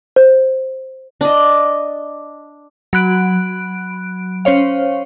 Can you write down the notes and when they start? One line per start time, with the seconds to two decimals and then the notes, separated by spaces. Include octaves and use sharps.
0.16 C5
1.21 D4 D#5
2.93 F#3 B5 F#6 D7
4.45 C#4 C5 C#5 F5